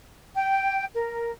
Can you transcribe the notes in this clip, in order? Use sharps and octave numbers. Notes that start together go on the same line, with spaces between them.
G5
A#4